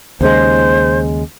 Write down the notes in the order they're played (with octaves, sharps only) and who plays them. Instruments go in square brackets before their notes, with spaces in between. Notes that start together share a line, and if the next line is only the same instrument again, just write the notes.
[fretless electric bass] D#2 C#3 G#3 [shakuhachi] C5